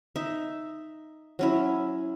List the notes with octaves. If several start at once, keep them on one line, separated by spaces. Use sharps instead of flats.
D#4 E5
F#3 C#4 E4